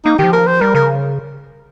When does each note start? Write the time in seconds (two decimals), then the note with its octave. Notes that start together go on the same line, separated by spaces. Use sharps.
0.05 A#3 D#4
0.19 D#3 G4
0.24 F3
0.33 A#4
0.47 C5
0.61 G3 A#4
0.75 C#3 A#4